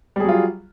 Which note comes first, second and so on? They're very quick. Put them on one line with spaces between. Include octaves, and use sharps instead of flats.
G3 G#4 F#3 F4